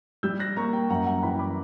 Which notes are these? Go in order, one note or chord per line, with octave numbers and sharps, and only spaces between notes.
G3 E6 G6
F#6 A#6
A#3 A#5 C#6
G5
F#2 F#5 A#5
F#5 A#5
E3 G5 B5
B5 D6